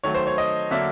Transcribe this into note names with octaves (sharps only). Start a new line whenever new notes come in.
D#3 F#3 A3 C#5
C5
C#5
D#5
D3 F#3 A#3 D4 E5